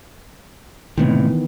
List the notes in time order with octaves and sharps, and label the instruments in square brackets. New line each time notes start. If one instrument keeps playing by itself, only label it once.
[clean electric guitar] C#2 A2 C3 [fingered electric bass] D#3 E3 B3